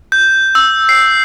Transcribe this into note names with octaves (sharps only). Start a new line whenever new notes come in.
G6
E6
C7